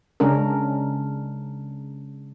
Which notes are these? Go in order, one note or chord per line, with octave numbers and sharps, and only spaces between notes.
C#3 G#3 C#4 D4 A#4